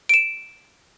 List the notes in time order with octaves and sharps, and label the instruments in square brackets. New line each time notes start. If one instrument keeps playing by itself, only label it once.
[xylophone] D7 E7